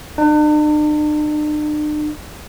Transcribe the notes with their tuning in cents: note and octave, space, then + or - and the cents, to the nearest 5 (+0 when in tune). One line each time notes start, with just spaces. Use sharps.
D4 +45